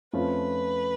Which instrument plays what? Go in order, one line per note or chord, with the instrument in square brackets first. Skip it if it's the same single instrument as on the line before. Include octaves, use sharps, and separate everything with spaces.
[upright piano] F2 F3 A3 C#4 F4 [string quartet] B4